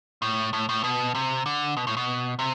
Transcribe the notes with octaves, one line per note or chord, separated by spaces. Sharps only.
A2
A2
A2
B2
C3
D3
B2
A2
B2
C3